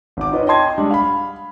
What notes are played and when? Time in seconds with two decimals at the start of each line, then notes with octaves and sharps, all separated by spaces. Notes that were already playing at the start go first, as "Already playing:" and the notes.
0.17 G#1 D6
0.32 D#4 F4 B4 C#5 D#5
0.47 D#5 G5 A5 C6 G#6
0.77 G3 G#3 D4
0.91 F5 B5